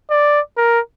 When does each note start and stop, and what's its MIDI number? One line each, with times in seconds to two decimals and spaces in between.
0.11 0.41 74
0.58 0.80 70